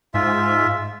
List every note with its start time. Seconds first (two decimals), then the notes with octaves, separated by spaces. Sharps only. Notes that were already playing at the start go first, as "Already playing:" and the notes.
0.14 G#2 F4 E5